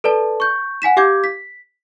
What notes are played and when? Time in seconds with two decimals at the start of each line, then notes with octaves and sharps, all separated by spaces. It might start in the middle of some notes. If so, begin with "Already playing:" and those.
0.04 A4 B4 D5 A5
0.40 C#6 G6
0.82 F#5 G#5 B6 E7
0.97 G4 F5 D6 G6 G#6
1.24 B6